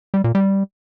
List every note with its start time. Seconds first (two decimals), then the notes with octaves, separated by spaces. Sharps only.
0.14 G3
0.24 A#2
0.35 G3